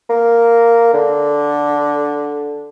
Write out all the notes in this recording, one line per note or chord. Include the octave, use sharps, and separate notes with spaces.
A#3
D3